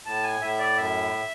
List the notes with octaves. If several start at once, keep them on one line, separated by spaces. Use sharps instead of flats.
A2 A5
G#5
A2 E5
D5
F#2 E5